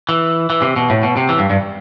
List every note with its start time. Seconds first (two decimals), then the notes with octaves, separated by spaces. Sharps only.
0.09 E3
0.50 E3
0.62 C3
0.76 B2
0.90 A2
1.03 B2
1.17 C3
1.29 E3
1.39 G2
1.50 G2